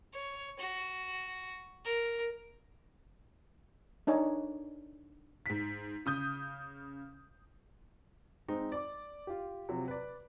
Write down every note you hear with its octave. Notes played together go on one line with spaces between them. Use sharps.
C#5
F#4
A#4
D4 D#4 C#5 G#5
G#2 B6
C#3 D#6 G6
G#3 C4 D#4
D5 D6
F4 G4
C3 F3 F#3
B4 D5